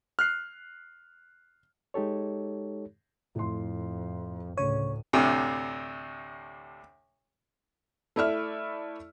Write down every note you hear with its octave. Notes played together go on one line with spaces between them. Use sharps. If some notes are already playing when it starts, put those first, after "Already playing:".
F6 F#6 C7
G#3 D#4 G4 A4 C#5
F2 A2 C6
D2 A2 C#3 C#5 D#7
D2 A2 C3
A3 E4 D5 E5 F6